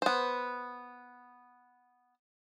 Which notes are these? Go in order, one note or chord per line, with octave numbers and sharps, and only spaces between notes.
B3 C5